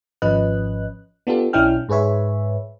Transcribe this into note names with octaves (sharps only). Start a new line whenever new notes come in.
G#1 F3 C#4 B4 D#5 F#6
B3 D4 F4 G4 A4
B1 C#4 D4 E4 G5 F6
G#2 G#4 B4 C#5 E5